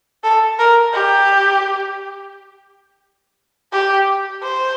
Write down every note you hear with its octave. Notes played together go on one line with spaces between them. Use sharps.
A4
A#4
G4
G4
C5